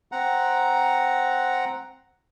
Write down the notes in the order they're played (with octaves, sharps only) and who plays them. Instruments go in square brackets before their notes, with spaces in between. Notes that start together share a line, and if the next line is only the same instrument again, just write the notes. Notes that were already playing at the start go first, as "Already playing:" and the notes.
[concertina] C4 F#5 A#5